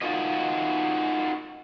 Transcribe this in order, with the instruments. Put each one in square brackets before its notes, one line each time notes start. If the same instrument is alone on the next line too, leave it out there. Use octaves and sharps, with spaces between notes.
[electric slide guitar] D#4 F4 F#4 A#4 D#5